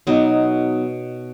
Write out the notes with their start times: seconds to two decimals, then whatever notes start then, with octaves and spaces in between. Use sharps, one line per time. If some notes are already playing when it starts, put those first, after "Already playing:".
0.07 B2 F#3 B3 D#4